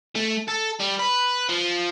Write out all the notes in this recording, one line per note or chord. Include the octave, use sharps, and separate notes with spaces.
A3
A4
G3
B4
F3